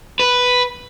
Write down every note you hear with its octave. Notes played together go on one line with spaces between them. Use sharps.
B4